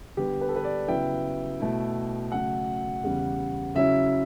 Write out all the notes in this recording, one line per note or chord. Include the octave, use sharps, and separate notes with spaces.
D3 G3 B3 G4
B4
A4
B4
D5
C#3 F#3 B3 E4 G5
B2 A3 E4
C#3 F#3 A3 F#5
E2 C#3 G3
C#3 F#3 C#4 E4 E5